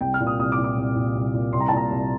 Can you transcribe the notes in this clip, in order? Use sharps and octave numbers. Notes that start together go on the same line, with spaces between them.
C2 G5
F6
A#2
D#6
C2 D#6
D6
A#2
D6
C2
A#2
C2
A#2
C2 C6
A#5
A5
A#2 A#5
C2